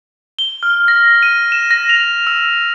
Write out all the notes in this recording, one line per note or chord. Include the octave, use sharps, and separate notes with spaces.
G7
F6
A#6
D#7
E7
A#6
F7
E6